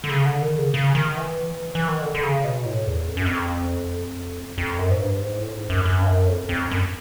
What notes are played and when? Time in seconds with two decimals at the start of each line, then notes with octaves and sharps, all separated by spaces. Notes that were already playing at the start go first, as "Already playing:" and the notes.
0.04 D3
0.10 C#3
0.26 D3
0.42 D#3
0.58 C#3
0.74 C#3
0.95 D#3
1.17 E3
1.75 E3
1.88 D#3
2.01 D3
2.15 D3
2.23 C#3
2.44 B2
2.65 A2
2.87 E2
3.08 F2
3.17 F#2
3.26 F2
4.58 F2
4.78 F#2
4.91 G#2
5.00 G2
5.21 G#2
5.38 A2
5.54 G#2
5.70 F#2
5.85 F#2
6.02 G2
6.07 F#2
6.28 F2
6.49 F2
6.71 F#2